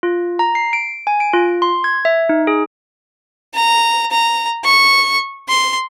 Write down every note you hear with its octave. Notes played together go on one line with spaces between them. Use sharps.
F4
A#5
C7
D7
G#5
D7
F4
C6
G#6
E5
D#4
G#4
A#5
A#5
C#6
C6